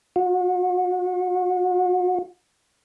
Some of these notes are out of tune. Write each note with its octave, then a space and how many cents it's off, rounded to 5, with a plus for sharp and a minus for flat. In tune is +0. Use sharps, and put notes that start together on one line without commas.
F#4 -35